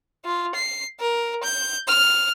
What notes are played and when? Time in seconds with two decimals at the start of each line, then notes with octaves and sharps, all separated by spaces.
0.25 F4
0.55 C7
1.00 A#4
1.43 G6
1.87 F6